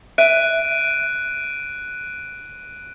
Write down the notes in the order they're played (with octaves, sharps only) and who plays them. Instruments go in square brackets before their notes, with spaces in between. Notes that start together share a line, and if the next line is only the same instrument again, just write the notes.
[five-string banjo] E5 [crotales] F#6 D7 D#7